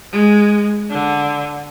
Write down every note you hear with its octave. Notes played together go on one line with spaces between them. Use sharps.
G#3
D3